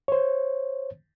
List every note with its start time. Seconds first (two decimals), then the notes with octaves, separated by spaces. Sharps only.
0.08 C5 C#5